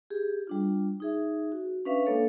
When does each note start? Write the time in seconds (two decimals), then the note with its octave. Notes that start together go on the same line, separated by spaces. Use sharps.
0.10 G4 G#4
0.47 G3 D4 F4
1.00 D#4 G#4 E5
1.52 F#4
1.85 C#4 D4 B4 E5 F5 C#6
2.06 G#3 A#3 D4 A4 C#5 F5